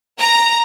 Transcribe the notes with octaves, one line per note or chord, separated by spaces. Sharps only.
A#5